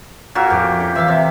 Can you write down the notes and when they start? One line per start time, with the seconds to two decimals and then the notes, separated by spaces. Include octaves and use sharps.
0.35 A#2 F#4 A#4 G#5 E6 F6
0.50 F2 A2 G4
0.80 C#4
0.96 E3 E5 F5
1.08 C3